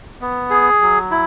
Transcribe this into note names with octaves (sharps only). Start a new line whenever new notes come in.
B3
G#4
F#3
E4